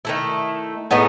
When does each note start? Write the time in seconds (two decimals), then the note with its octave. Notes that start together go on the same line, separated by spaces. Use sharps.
0.05 D#3 A3 E4
0.91 A2 G#3 B3 D#4